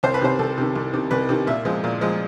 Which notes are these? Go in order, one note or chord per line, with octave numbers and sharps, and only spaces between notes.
C2 C5
B4
C3 D#3 C5
C2 A4
C3 D#3
C2
C3 D#3
C2 B4
C3 D#3
A#2 E5
F3 G#3
A#2
F3 G#3